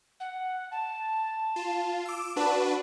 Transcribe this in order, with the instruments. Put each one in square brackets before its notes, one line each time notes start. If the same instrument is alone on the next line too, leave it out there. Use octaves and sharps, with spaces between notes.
[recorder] F#5
A5
[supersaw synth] F4
D6 E6
[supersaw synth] D4 F#4 B4 [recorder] A5